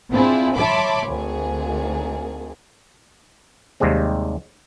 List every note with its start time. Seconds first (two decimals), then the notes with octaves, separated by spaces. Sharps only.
0.11 C4 D4 E4 F4 G#4
0.56 C#5 E5 A5 B5 C6 D6
1.08 G#1 D2 G#4
3.80 D#2 C3 G3 G#3 C4